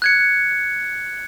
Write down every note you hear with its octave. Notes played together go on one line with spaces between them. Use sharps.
F#6 G#6 C#7